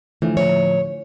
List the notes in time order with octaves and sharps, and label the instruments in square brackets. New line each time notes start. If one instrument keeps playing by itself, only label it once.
[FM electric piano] A2 D3 F3 [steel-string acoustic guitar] E3
[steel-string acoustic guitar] C#5